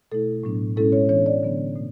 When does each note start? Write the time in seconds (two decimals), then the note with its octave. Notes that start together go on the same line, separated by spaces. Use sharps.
0.12 B2 A3 E4 A4
0.44 A2 F#3 B3 D4
0.77 A2 G#3 C#4 E4 A4
0.92 C#5
1.09 E3 B3 D4 C#5
1.26 D5
1.43 D3 F#3 B3 D4
1.75 B2 A3